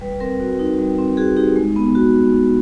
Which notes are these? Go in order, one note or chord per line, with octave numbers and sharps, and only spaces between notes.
G3 B4
C4 A#4
F#4
D#4
G3
C4
F#4 G#4
D#4 G4
G#3
B3
F#4